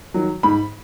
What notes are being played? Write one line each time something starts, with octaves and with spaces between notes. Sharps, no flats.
D#3 F#3
G#2 B5